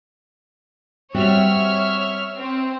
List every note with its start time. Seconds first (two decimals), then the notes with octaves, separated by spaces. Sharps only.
1.15 G3 C4 F#4 C#5 E5 F6
2.37 C4